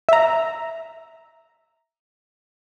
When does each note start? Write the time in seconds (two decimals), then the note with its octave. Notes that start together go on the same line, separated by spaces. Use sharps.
0.09 E5 A#5